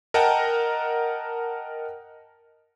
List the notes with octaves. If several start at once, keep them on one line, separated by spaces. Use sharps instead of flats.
A#4 D#5 F#5 G5 A5 A#5